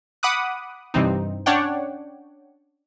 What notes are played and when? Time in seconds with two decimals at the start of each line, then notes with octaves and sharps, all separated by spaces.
0.23 F#5 B5 D6 D#6 F#6
0.94 G2 C3 E3 C4 D#4
1.46 C#4 D4 C#5 D5 F#5 G5